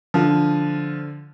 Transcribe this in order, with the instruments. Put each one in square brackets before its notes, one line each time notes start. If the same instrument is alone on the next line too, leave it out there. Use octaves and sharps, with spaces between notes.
[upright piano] D3 F3